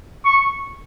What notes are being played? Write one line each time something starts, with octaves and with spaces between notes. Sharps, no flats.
C#6